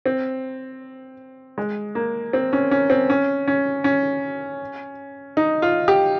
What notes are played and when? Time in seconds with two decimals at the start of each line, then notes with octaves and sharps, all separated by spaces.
0.06 C4
1.58 G#3
1.95 A#3
2.33 C4
2.53 C#4
2.71 C#4
2.90 C4
3.10 C#4
3.48 C#4
3.84 C#4
5.37 D#4
5.62 F4
5.88 G4